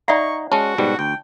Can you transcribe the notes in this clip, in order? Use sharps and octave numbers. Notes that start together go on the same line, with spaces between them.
D#4 D5 E5 F#5 A#5 C#6
G#3 C#4 F#4 A5
G#2 B2 G3
D2 G5